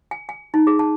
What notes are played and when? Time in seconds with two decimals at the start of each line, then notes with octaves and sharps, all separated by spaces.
0.11 G#5
0.29 G#5
0.54 D#4
0.67 G#4
0.79 A5